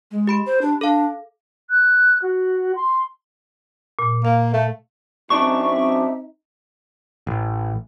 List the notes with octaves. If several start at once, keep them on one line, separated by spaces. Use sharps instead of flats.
G#3
G4 B5 D7
C5
D4
D4 A4 F5
F#6
F#4
C6
A#2
A#3 F5
A3
F#2 C4 D4 D#4 E5 C#6
A1